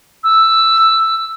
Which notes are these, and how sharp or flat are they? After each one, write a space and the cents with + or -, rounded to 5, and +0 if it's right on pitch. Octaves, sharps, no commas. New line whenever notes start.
E6 +5